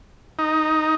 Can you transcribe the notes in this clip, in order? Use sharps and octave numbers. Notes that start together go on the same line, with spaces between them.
D#4